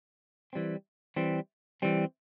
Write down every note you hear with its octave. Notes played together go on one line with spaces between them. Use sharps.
E3 G3 C4
E3 G3 C4
E3 G3 C4